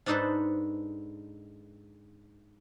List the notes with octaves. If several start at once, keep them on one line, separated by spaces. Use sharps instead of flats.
G#2 D4 D#4 A4 B4 C5